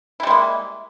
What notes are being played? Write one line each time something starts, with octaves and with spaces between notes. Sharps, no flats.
G3 G#3 A#3 E4